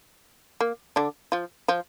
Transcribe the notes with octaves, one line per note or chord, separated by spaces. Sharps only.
A#3
D3 D4
F3 F4
F3 F4